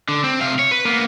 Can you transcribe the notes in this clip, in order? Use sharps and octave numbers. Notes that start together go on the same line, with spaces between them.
D3
C4
C3 F5
C#5
B4
A#3 B3